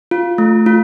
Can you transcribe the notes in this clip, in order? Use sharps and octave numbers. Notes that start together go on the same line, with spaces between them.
F4
A3
F4